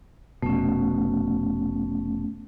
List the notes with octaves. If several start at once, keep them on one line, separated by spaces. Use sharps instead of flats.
F1 B2 A3 C#4